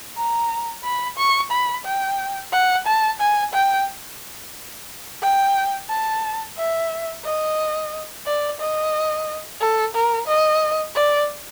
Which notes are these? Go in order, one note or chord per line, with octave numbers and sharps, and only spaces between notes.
A#5
B5
C#6
B5
G5
F#5
A5
G#5
G5
G5
A5
E5
D#5
D5
D#5
A4
A#4
D#5
D5